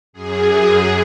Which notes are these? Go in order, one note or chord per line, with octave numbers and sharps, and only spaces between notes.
F#2 G#4